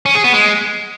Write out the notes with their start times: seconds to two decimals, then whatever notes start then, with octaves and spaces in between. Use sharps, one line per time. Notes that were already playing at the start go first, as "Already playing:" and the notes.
0.06 C#4
0.15 G#4
0.24 B3
0.34 G#3